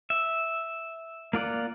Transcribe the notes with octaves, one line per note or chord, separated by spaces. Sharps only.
E5
A#3 F4 D5 F#5